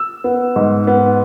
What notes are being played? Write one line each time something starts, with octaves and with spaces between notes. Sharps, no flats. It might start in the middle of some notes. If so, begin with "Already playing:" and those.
Already playing: E6
B3
G#2
B3